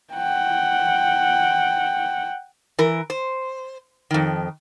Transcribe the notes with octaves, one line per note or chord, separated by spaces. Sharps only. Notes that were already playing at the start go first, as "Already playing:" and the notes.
F#5 G5
E3 A#4
C5
F2 D#3